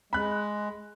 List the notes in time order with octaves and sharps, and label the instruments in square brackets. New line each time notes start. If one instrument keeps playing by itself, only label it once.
[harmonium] G#3 [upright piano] B5 F#6